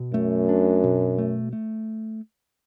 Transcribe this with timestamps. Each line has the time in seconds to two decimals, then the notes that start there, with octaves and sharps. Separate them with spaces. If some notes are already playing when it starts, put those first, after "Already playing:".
Already playing: B2
0.13 F#2 A3
0.49 D4
0.84 B2
1.18 A3
1.53 A3